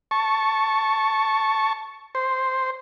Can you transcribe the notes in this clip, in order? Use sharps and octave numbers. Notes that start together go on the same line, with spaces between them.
A5 C#6
C5